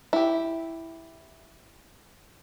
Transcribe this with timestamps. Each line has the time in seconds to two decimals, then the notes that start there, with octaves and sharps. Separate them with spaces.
0.13 E4 G4